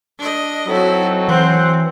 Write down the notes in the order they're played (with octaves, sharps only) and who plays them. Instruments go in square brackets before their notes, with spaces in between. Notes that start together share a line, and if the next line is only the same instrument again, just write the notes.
[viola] D4 D#5
[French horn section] F#3 [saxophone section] C4 D#4 A4 [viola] E4 F#4
[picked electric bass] E3 [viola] C4 [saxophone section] C5 F#5